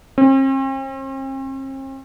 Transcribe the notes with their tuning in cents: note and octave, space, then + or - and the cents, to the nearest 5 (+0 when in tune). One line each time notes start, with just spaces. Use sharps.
C4 +45